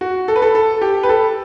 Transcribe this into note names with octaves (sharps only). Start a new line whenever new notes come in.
F#4
A4
B4
A4
A4
G4
B4
A4